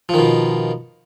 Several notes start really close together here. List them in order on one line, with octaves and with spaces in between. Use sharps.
F3 D#3 B2